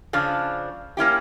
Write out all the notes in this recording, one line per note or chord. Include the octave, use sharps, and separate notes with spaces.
C#3 F3 D4
A#3 C#4 E4 G4